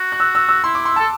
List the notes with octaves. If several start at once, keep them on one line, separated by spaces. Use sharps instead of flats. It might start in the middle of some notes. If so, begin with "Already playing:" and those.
Already playing: F#4
F#6
E6
E6
E6
E4 C6
D6
C6
A4 A5